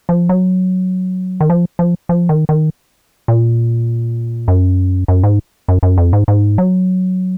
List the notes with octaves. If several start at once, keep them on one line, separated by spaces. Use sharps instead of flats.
F3
F#3
D#3
F3
F3
F3
D#3
D#3
A#2
F#2
F#2
G#2
F#2
F#2
F2
G#2
G#2
F#3